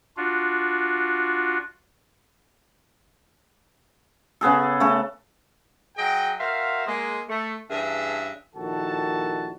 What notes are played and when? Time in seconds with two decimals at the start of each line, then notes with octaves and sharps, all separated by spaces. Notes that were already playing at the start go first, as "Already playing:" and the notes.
0.17 D4 F4 F#4
4.41 C#3 B3 G#4 A4
4.80 C#3 A3 A4
5.96 F#3 G#4 D#5 G5
6.39 F#4 A#4 C5 E5 F5
6.86 G#3 A#3
7.28 A3
7.70 G2 E3 C#4 G#4 E5 A5
8.56 A#1 D#3 E4 F#4 A4 A5